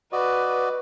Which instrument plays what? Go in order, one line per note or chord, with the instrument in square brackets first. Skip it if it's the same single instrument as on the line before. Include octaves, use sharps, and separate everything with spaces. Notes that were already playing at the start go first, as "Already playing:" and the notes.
[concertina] F#4 D5 D#5 [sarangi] B4